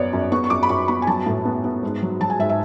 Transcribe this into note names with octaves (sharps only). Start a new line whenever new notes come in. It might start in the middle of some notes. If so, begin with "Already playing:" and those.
Already playing: F#2 B3 C#5 D5
F#2
B3 C#6
C#6
F#2 D6
B5
F#2 C#6
B3 B5
G#5
F#3 A5
A2
B3
B3
G#2
F#3
F#3 A5
G#5
G#2 E5
E5